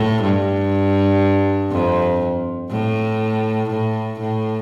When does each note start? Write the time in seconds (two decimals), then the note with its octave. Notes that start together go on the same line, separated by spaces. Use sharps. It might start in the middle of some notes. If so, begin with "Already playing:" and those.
Already playing: A2
0.23 G2
1.72 F2
2.71 A2
3.70 A2
4.20 A2